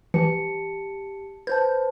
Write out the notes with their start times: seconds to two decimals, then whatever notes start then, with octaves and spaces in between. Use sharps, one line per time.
0.14 E3 G4 A5 C#7
1.47 B4 C5 A5 G6